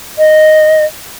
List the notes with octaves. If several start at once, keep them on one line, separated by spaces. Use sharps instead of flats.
D#5